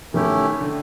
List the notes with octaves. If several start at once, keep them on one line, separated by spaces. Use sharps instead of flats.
D#3 A3 C#4 E4 G4
D3